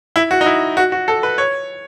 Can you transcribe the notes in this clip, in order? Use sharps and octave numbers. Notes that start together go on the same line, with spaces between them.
E4
F#4
D#4
E4
F#4
F#4
A4
B4
C#5